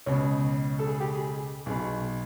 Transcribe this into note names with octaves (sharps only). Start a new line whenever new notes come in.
C#2 B2 C#5
A4
G#4
G4
G#4
B1 B2 G#4